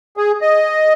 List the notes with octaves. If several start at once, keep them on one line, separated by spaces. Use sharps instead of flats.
G#4
D#5